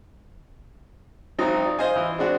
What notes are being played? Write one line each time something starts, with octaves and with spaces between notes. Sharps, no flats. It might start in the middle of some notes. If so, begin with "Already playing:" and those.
G#1 F#3 C4 D#4 A#5
D5
C5 D#5 F5 G#5
E3
G#3 C4 D4 F#4